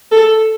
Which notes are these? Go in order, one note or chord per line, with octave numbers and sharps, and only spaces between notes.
A4